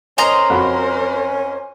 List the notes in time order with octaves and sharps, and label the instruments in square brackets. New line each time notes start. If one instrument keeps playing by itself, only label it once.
[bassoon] C#4 [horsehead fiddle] A#4 C5 [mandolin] D#5 A#5 C6
[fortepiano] F2 F#4 B5